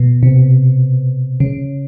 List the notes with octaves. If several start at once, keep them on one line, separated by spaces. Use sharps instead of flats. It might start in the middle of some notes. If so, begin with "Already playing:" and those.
Already playing: B2
C3
C#3